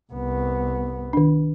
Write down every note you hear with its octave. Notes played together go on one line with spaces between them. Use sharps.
C2 B3
D#3 D4